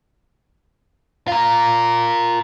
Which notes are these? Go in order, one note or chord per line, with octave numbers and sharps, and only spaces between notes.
F4 A#4